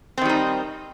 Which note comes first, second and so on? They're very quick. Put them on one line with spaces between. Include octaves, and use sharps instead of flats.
C4 D#3 G3 D#4